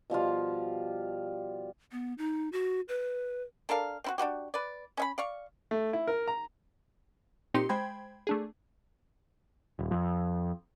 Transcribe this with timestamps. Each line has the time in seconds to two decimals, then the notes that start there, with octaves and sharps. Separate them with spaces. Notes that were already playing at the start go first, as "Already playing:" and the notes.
0.10 B2 F3 G3 F4
1.92 B3
2.18 D#4
2.52 F#4
2.88 B4
3.69 D4 A4 A#4 F5
4.04 C4 E4 F#4
4.18 D4 D#4 F#4 G4
4.54 B4 D5
4.97 C#4 E5 B5
5.18 D5 F5 C#6
5.71 A3
5.93 E4
6.07 A#4
6.28 A#5
7.54 A#2 C4 D#4 G4 C6 C#7
7.69 G#3 C5 G5 B5 G#6
8.27 A3 D4 G#4
9.79 D#1
9.91 F2